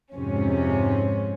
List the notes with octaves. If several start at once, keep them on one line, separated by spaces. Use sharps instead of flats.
F2 G#2 C3 C#4